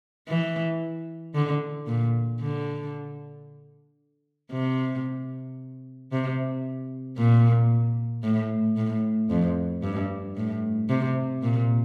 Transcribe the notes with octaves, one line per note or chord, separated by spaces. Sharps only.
E3
D3
A#2
D3
C3
C3
A#2
A2
A2
F2
G2
A2
C3
A#2